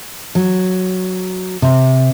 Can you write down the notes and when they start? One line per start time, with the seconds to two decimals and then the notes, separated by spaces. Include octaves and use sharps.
0.35 F#3
1.62 C3